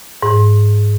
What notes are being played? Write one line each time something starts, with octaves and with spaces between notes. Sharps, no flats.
G#2